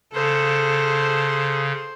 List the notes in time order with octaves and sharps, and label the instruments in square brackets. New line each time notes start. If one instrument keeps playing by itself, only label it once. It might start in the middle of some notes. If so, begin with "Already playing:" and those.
[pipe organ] C#3 [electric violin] A4 [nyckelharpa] C5